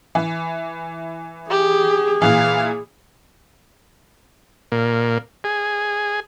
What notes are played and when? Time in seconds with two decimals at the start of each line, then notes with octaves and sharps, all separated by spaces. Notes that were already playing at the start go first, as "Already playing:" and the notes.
0.15 E3
1.50 G4 G#4
2.22 A#2 E3 F5
4.72 A#2
5.44 G#4